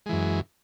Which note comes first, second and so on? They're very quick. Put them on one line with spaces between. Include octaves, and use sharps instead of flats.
G#3 E3 F#2